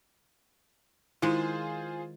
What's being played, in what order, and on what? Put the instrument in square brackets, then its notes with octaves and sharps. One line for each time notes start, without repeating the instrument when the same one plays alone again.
[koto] D#3 G#3 [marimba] E4 [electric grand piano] F4 G#4 C5